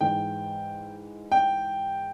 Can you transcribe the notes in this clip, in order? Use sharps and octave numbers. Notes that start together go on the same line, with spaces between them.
G#2 E3 G5
G5